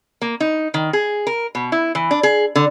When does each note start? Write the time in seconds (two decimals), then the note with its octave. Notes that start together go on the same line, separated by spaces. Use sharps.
0.22 A#3
0.40 D#4
0.74 D#3
0.93 G#4
1.27 A#4
1.55 B2
1.72 E4
1.95 E3
2.11 D4
2.23 G#4
2.55 D3